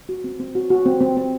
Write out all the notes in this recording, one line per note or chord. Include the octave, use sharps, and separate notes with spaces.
F#4
C4
C4
F#4
F#4
C4
C4
C4